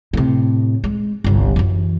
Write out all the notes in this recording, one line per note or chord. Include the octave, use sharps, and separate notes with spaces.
A2 C3
G#3
G1 C2
F#2 E3